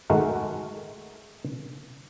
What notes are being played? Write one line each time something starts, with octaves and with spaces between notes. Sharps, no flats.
D#3 G#3 A3 F#4 A#4